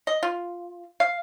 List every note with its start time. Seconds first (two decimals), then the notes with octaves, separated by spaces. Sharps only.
0.07 D#5
0.23 F4
1.00 F5